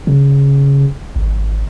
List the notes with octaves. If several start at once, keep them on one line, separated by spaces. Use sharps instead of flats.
C#3
G#1